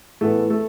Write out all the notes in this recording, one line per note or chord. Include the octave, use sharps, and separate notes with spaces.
A2 E3 A3 B3 A4
A3 A4